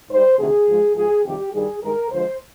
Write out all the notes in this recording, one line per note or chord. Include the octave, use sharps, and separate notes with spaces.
G#2 G3 C5
D2 C3 D#3 G#4
G#2 F3 G#3
G#2 F3 G#3 G#4
F2 C3 D#3 G3 G4
G2 D#3 G3 G#4
G2 D#3 G#3 A#4
D2 D3 F3 G#3 C5